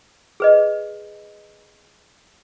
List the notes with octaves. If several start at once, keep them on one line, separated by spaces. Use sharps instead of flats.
G#4 B4 D#5